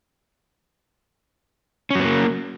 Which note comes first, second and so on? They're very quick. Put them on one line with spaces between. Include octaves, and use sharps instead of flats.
C#4 F#3 B3 A#3